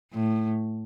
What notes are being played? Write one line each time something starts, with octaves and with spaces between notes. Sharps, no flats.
A2